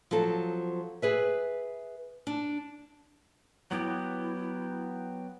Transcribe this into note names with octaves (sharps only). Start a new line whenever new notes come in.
F3 F#3 C4 A4
G#4 B4 E5
D4
F#3 B3 E4 G4